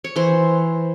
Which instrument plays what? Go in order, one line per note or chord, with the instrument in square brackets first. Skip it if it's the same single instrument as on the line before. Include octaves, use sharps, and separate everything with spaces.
[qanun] C#5
E3 C5